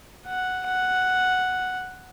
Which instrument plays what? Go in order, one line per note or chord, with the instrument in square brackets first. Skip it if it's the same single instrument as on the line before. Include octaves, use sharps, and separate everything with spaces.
[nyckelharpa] F#5
F#5